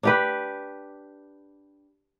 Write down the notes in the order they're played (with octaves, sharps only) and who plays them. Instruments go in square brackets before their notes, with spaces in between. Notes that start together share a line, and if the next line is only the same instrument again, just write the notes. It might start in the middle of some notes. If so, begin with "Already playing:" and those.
[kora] D4 G4 B4